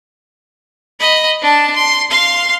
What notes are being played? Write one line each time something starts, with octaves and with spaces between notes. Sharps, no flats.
D#5 B5
D4 A5
C6
F5 C6